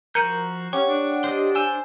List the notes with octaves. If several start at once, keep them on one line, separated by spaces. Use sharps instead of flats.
F3 F#4 A#4 A#5 G6 C#7 D#7
C#4 G4 C#5 F#5 C#6
D4
C5 D#5
C5 G#5 E6 E7